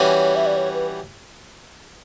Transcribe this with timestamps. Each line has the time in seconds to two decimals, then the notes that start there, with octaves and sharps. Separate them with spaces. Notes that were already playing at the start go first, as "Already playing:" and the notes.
Already playing: E3 G3 C#4 F#4 C#5
0.36 E5
0.46 D5
0.57 C#5
0.74 B4